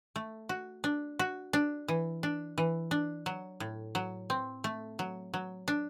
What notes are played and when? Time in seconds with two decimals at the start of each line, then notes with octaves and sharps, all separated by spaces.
0.16 A3
0.49 F#4
0.84 D4
1.19 F#4
1.53 D4
1.88 E3
2.23 D4
2.58 E3
2.91 D4
3.26 F#3
3.60 A2
3.95 F#3
4.30 C4
4.64 A3
4.99 F#3
5.34 F#3
5.68 D4